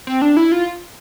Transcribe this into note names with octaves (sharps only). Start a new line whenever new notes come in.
C4
D4
E4
F4